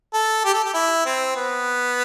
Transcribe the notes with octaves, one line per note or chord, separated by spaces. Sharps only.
A4
G4
A4
G4
E4
C4
B3